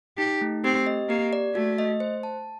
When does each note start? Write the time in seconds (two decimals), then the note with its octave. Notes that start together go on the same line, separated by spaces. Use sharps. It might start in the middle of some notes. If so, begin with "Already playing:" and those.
0.18 D#4 G4
0.41 A3
0.64 C4 G4
0.87 D#5
1.09 A#3 G4
1.33 D5
1.55 A3 F#4
1.78 D#5
2.00 C5
2.23 A5